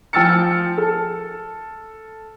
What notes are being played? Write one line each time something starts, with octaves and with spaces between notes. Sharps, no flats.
F3 G5 E6 F6 A6 C#7
A4